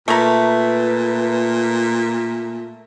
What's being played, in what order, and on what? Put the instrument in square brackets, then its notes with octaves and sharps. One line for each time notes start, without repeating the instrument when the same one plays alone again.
[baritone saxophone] A#2 [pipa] A3 A#5 [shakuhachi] B4